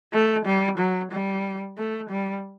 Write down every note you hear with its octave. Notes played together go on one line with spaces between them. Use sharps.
A3
G3
F#3
G3
A3
G3